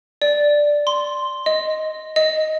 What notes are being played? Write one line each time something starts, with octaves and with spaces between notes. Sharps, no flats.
D5
C6
D#5
D#5